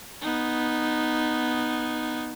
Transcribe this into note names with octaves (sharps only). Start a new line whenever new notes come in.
B3 D#4